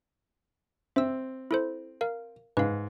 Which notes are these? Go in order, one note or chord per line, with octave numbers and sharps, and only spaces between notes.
C4 E5 E6
E4 A4 C5
A#4 F5
G#2 B4 F5